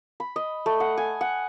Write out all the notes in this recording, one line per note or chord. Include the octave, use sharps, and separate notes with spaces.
B5
D#5
A3
F#5
G#5
F#5